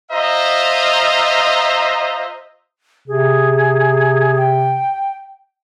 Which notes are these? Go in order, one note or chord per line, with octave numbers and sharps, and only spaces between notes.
F4 C5 D#5 E5 A#5
C3 G#4
G5